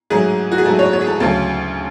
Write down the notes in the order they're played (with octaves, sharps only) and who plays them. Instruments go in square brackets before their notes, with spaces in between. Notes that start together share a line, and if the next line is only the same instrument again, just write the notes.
[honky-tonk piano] G#2 F#3 A3 G#4
F#4
G#4
G#2 F#3 A3 A4
C#5
C#5
G#4
A4
D2 C#3 F#3 A3 A4